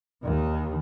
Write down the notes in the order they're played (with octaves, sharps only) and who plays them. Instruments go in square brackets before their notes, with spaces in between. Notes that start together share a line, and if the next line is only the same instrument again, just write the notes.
[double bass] D#2 D#3